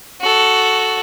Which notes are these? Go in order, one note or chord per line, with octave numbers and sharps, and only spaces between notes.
F#4 A4